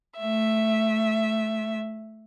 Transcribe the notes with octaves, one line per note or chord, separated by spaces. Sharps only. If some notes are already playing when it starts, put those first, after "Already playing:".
A3 E5